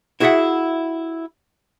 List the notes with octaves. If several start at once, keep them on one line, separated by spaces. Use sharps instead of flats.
E4 F#4 G#4 C#5 E5 F#5